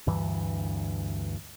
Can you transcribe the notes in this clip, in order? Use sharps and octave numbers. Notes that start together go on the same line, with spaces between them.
D2 G2 E3